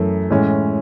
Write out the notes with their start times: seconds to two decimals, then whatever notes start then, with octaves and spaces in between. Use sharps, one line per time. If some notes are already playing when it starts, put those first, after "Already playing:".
Already playing: F#2 E3 A3
0.30 A2 E3 G#3 C#4